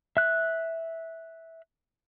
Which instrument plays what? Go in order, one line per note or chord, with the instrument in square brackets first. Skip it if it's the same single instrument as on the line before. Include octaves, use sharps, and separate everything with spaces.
[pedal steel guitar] E5 F#6